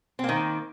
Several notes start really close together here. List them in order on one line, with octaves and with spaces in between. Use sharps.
C4 A#3 D#3